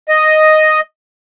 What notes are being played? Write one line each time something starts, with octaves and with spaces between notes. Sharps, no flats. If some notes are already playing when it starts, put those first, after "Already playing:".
D#5